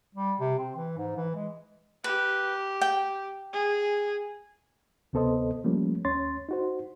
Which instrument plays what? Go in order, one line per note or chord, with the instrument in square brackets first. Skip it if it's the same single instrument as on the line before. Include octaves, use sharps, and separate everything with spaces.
[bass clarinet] G3
C3
C4
E3
G#2
E3
G#3
[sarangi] G4 [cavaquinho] B4
[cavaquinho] G5
[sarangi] G#4
[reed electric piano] D2 C3 B3 A4 C5 D#5
F3 G3 A3 A#3 C#4
D#2 C#4 C#5 C6 A6
D#4 F#4 C5